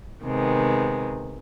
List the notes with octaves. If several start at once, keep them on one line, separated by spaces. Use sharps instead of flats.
C3 D#3 G#3 B3